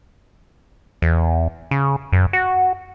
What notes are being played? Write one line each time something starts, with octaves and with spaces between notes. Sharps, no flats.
E2
C#3
F#2
F#4